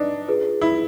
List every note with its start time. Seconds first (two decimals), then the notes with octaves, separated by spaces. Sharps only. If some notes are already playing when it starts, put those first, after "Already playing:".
Already playing: D4 D#4 B4 D5 A5
0.28 F4 G#4 B4
0.61 E4